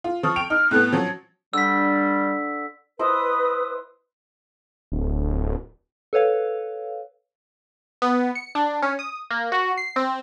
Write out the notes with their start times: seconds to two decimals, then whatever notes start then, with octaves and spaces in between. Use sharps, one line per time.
0.04 F4
0.23 F3 C#6 D#6 F6
0.36 G5 D7 F7
0.50 D#4 F6
0.71 A2 A3 B3 F#6
0.92 F3 F#3 C#4 G#6
1.53 D3 G3 E6 B6
2.99 E4 B4 C5 D#5 D#6
4.92 D1
6.13 A4 B4 C#5 F5
8.02 B3
8.35 C#7
8.55 D4
8.82 C#4
8.99 D#6
9.31 A#3
9.52 F#4
9.78 C7
9.96 C4